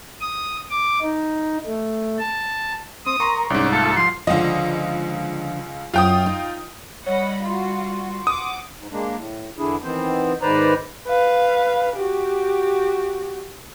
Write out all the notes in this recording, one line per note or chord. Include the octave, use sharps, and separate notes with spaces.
D#6
D6
D#4
A3
A5
C4 D#6
A#4 A#5 C6 C#6
C2 G#2 C#4 D5
A3 F4 A4 A5
F3 C6
C#2 D3 F3 D#5
F#2 F4 G5 D#6
D#4
G3 C#5 D#5 F#5 B5
F4 F#4 C6
F#5 D6 D#6
G#2
G#3 A#3 D4
A2
E2 D3 D4 E4 G#4
D#3 E3 B3 C4 C5
G#2 D#3 B4 C5 D5 A#5
B4 F5
F#4 G4